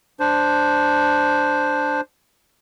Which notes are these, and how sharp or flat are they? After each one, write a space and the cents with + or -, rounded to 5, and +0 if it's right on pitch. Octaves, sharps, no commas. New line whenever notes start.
D4 +0 C5 -5